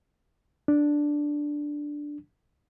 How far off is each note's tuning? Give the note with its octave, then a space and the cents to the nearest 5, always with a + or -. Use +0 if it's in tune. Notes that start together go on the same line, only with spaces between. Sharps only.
D4 +0